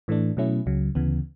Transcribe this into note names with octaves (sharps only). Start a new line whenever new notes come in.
A2 E3 A3 D4
B2 F#3 A3 C#4 E4
C#2 C#3 F#3
D2 C#3 E3 B3